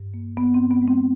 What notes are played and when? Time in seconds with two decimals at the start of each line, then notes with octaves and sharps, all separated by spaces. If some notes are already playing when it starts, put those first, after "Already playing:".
Already playing: G2
0.14 A#3
0.37 G2 B3
0.54 C4
0.60 G2
0.71 B3
0.82 G#3
0.87 C4